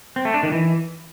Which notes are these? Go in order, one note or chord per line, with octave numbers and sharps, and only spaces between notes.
C4
A3
D4
D#3
E3